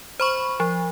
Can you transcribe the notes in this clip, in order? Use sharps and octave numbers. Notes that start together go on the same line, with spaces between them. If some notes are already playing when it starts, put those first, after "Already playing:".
C5 B5 C#6
F3